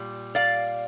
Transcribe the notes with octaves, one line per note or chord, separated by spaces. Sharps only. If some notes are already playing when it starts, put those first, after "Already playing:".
Already playing: A#2 G3
D5 F5